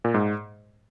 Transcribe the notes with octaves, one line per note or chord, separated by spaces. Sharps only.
A#2
G#2